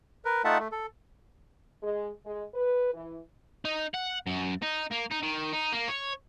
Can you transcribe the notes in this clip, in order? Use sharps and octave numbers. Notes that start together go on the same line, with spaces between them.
A#4 B4
A3 D#4 F4 E5 F#5 A5
A3
A4
G#3
G#3
B4
E3
D#4
F#5
F#2
D#4
A#3
D#4
D#3
D#4
A#3
C#5